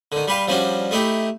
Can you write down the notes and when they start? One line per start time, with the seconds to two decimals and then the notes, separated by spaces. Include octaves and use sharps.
0.12 D3 D#3
0.28 G3 G4 B4 F5
0.47 F3 G3 C#4 D4 F#4
0.91 A3 D#4 E4 G4